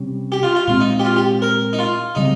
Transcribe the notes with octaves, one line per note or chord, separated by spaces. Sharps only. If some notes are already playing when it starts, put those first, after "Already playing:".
Already playing: C3 G3 C#4
G4
F4
F4
A#2 G#3 C4 F4
D#4
G4
F4
G4
A#4
D#4
F4
C#3 G3 C4 D#4